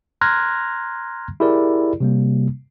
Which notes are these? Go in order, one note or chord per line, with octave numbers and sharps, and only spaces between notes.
A#5 C6 F6 F#6 G#6 A#6
E4 G4 G#4 A#4 D5
C3 G3 A#3